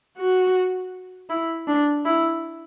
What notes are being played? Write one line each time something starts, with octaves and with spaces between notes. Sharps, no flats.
F#4
E4
D4
E4